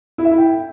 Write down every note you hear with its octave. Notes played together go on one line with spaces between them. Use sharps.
E4
E5
E4
G5